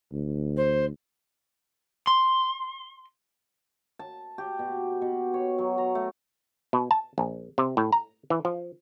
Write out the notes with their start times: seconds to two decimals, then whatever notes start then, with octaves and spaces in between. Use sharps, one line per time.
0.13 D2
0.56 C5
2.07 C6
3.99 A5
4.38 G4
4.59 B2
5.02 B2
5.34 C#5
5.58 F#3
5.78 A#5
5.95 A3
6.73 B2
6.91 A5
7.18 A#1
7.58 C3
7.77 A2
7.92 A#5
8.30 E3
8.45 F3